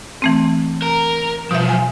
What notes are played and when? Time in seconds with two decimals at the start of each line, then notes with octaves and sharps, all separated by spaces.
0.22 E3 A3 C4
0.82 A#4
1.51 B2 F3 F#3 E5
1.69 G#5